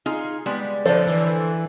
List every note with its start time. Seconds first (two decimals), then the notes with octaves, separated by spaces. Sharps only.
0.06 D#4 F4 G#4
0.46 G3 G#3 B3
0.86 D3 F3 A4 C5 D5
1.07 E3